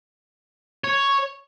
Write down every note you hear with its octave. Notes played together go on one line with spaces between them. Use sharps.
C#5